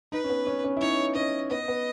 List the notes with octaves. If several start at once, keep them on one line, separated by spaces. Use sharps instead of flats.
D#4 B4
C#4
B3
C#4
C#4
E4
D#4 C#5
C#4 D#5
B3 D#5
B3